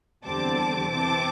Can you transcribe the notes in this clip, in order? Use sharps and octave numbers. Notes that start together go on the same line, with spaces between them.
E2 D3 G3 C4 A5 D6
C3 E3 C4 A5 D6